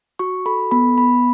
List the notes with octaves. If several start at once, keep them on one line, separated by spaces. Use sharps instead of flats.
F#4 C#6
A4 B5
B3 B5
B3 B5